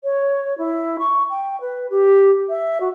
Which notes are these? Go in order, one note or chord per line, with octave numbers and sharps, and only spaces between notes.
C#5
E4
C#6
G5
B4
G4
E5
F#4